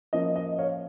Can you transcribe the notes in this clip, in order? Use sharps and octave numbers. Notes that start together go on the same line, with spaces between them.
F3 A#3 C#4 D#5
D#5
C#5 F5